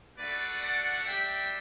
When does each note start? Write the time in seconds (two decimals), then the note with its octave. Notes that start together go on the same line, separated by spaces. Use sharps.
0.18 A3 D4 F#4 B4 D5
0.62 D5 F#5
1.06 G3 D4 G4 E5 G5